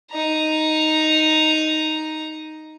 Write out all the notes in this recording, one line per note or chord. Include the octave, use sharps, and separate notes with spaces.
D#4 A#5